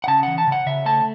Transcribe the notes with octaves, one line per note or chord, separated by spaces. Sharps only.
F#5
C#3 A5
E3 F#5
A5
C#3
F#5
C#3 E5
A3 A5